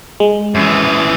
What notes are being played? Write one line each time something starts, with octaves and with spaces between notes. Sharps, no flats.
G#3
F#2 E3